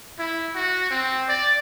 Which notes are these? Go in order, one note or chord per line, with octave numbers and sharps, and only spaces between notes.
E4
F#4
C4
D5